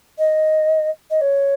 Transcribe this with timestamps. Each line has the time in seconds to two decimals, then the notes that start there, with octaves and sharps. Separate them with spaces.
0.18 D#5
1.10 D#5
1.21 C#5